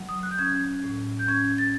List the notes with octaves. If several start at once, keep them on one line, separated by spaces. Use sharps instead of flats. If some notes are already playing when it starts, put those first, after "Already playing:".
Already playing: F#3
D#6
F#6
G6
C#4 G#6
A2
G6
C#4 G#6
A6